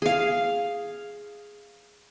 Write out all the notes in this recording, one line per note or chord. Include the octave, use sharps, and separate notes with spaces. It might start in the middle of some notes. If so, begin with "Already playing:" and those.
G#4 F5